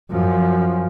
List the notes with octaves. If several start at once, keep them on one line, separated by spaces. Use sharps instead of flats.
F#2 F3